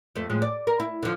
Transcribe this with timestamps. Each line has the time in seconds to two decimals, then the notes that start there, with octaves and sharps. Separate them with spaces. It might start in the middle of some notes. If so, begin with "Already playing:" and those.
0.16 F2 A3
0.30 A2 F3 G#3
0.42 D5
0.67 A#4
0.80 E4
1.03 D3 F3